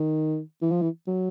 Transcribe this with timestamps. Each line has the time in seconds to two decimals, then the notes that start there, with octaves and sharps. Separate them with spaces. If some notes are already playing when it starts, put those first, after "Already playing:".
Already playing: D#3
0.62 E3
0.71 F3
0.82 E3
1.07 F#3